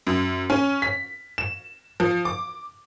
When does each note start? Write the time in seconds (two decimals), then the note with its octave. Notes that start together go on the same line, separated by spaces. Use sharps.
0.07 F#2
0.50 C#4
0.82 B6
1.38 E7
2.00 F3
2.25 D6